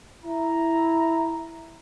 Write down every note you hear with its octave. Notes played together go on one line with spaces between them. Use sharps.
E4 A#5